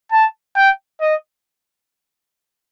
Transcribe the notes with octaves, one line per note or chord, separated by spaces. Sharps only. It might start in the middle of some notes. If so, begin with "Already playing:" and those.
A5
G5
D#5